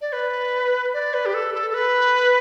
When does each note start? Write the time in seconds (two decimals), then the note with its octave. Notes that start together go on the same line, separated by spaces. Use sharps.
0.01 D5
0.13 B4
0.93 D5
1.14 B4
1.26 G4
1.34 A4
1.54 A4
1.70 A4
1.74 B4